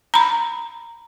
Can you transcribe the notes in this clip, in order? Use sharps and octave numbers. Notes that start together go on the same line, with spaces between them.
A#5 B5